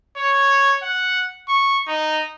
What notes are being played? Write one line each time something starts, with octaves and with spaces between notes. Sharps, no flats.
C#5
F#5
C#6
D#4